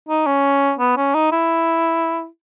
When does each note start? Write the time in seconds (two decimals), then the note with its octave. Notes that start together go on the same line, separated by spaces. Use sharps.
0.09 D#4
0.26 C#4
0.79 B3
0.97 C#4
1.14 D#4
1.32 E4